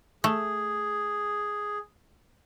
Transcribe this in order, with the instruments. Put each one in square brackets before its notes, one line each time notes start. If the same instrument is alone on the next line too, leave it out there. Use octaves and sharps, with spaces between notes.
[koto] A3 [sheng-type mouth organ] G#4